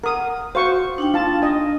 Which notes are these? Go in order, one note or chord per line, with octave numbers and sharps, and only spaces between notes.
A#4 F#5 D#6
F#4 C5 F5 C#6
D4 D#4 G5
F4 A5
D#5 G#5